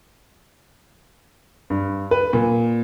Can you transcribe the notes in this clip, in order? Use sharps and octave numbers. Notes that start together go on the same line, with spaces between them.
G2
B4
A#2